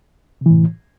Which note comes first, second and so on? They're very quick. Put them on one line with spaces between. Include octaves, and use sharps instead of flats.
C3 E3 A2